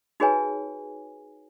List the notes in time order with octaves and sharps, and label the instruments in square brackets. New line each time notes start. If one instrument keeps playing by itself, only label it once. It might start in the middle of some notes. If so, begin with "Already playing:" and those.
[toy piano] D#4 F#4 G#4 B4 C#5 G#5